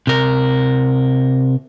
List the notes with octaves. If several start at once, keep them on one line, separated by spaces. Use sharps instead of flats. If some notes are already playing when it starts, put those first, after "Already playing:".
C3 A#4